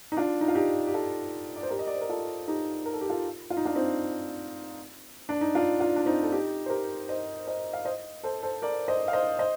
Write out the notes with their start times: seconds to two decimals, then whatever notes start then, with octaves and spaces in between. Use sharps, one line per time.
0.12 D#4
0.17 D4 F4
0.41 D#4
0.48 F4
0.55 D#4 G4
0.87 G4
0.94 F4 A4
1.56 D5
1.63 C5
1.70 G4 A#4
1.79 D#5
1.87 D5
1.95 C5
2.01 A#4
2.09 F4 A4
2.48 D#4 G4
2.86 A#4
2.93 A4
3.01 G4
3.09 F4 A4
3.50 F4
3.57 D#4
3.65 D4 F4
3.76 C4 D#4
5.29 D4
5.41 D#4
5.55 D4 F4
5.80 D4 F4
5.96 D4
6.06 C4 D#4
6.23 A4
6.32 D#4 G4
6.66 C5
6.70 G4 A#4
7.09 C5 D#5
7.47 C5 D#5
7.73 F5
7.85 C5 D#5
8.23 A4 C5
8.43 A4 C5
8.62 A#4 D5
8.88 C5 D#5
9.08 F5
9.13 C5 D#5
9.39 C5 D#5